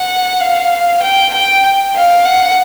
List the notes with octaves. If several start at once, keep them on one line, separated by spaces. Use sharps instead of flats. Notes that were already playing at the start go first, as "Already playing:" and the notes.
Already playing: F#5
F5
G5
G5
F5
F#5